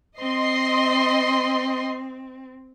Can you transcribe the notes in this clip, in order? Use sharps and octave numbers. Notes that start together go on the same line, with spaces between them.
C4 D#5 C6